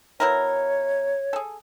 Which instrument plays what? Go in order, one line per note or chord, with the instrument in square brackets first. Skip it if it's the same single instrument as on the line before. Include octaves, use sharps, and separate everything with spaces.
[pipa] B2 E4 A#4 [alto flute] C#5
[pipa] G#4 A4